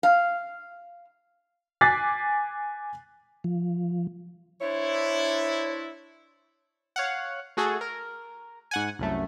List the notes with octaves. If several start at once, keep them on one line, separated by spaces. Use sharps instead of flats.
F5
G#5 D6 F#6 A6 B6 C7
F3
D4 E4 C5 C#5
C#5 F5 F#5
A3 F#4 G#4 A4
A#4
G#2 F#5 G#5
C2 F#2 A3